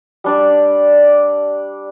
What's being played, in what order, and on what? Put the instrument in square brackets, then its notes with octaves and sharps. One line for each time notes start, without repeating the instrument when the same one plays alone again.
[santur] G3 D4 D5